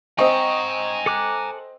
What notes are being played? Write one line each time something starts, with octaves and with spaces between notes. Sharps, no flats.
C4 D#5 G5 G#5 A#5 C#6
A4 D6 F#6